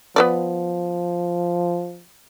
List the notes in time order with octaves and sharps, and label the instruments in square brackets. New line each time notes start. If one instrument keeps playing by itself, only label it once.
[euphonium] F3 [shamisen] B3 B4 D5